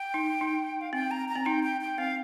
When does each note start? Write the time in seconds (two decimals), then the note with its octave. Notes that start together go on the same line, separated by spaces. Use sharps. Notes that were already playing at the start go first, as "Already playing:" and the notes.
Already playing: G5
0.14 D#4
0.41 D#4
0.81 F5
0.93 C4 G5
1.11 A#5
1.29 A#5
1.36 C4
1.46 D#4 G5
1.64 G5
1.81 G5
1.98 C4 F5